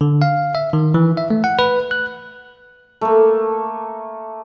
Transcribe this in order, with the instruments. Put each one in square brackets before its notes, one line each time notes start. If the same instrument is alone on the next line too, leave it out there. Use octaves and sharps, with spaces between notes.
[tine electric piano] D3
F5
E5
D#3
E3
E5
A3
F#5
B4
F#6
[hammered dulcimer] A3 A#3